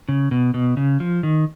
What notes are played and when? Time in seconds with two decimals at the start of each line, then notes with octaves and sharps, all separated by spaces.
0.09 C#3
0.31 B2
0.54 B2
0.77 C#3
1.00 F3
1.23 D#3